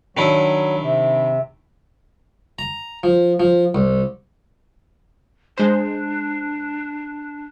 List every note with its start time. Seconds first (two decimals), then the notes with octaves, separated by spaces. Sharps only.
0.17 D#3 F#3 D4 E4
0.82 C3
2.59 A#5
3.03 F3
3.40 F3
3.75 C2
5.58 G#3 D4 C5